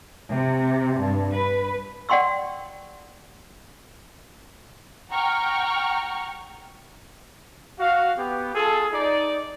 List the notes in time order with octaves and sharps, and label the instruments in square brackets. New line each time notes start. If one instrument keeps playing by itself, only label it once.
[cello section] C3
G2
B4
[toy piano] D5 F#5 G5 C6 C#6 E6
[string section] F#5 G5 A#5 C#6 F6
[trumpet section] F#4 F5
B3 G4
F4 G#4 A4
D#4 D5